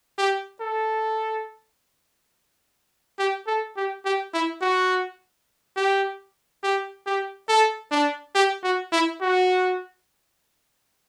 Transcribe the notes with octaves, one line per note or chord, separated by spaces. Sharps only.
G4
A4
G4
A4
G4
G4
E4
F#4
G4
G4
G4
A4
D4
G4
F#4
E4
F#4